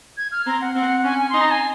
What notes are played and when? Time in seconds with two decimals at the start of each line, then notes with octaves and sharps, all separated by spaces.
0.17 G#6
0.32 F6
0.46 C4 A#5
0.61 F#5
0.75 C4 F#5
1.04 C#4 G#5
1.19 G#5
1.30 D#4 C6
1.41 A#5
1.51 G#5